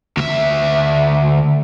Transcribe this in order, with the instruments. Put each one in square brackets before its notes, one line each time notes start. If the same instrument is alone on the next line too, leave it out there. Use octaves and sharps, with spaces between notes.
[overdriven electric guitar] D2 E5